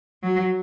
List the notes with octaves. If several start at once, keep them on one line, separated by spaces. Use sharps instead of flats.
F#3